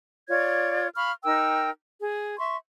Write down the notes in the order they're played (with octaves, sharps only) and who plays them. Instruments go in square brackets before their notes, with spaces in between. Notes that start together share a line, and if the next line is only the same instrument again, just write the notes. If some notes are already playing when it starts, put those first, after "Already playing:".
[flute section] F4 C#5 D5 G#6
F5 B5 C#6 F6
D#4 A#4 G5 E6
G#4
E5 C6 C#6